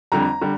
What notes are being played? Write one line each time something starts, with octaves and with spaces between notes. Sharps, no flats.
F2 D3 G3 A#5
D3 G3